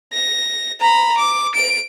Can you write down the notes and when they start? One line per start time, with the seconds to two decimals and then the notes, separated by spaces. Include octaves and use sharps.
0.13 A#6
0.81 A#5 B5
1.17 D6
1.54 D7